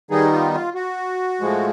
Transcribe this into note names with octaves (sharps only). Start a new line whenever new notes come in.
D#3 G3 B3 D#4 G#4
F4
F4
F#4
A2 F3 G#3